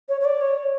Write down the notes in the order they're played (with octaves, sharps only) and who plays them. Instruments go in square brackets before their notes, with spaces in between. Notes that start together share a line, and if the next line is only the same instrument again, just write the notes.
[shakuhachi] C#5
C#5
D5
C#5